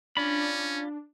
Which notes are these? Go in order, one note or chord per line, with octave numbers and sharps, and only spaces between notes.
C#4 D4 F4 D5 B5